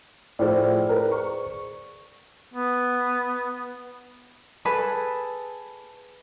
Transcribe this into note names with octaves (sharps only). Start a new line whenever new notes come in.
A2 F3 G#4 C5 D5
A#4 B4
C#6
B3
G#4 A4 B4